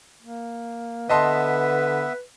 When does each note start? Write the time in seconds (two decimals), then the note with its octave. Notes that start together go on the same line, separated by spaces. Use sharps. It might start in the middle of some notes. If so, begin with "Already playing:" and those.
0.22 A#3
1.09 D3 B3 B4 D#5 E5 A5 C6